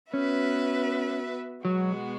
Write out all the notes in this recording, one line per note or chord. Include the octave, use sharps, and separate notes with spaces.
B3 C#4 F#4 B4 E5
B2 F#3 G#3 B3 F#4